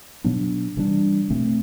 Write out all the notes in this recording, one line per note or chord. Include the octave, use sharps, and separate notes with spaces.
B2 F#3 B3 D4
C3 E3 G3 D4
B2 A3 C4